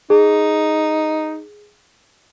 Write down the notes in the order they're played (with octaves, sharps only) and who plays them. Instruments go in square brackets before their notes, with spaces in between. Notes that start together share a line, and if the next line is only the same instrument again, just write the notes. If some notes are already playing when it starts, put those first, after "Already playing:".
[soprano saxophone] D#4 [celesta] G#4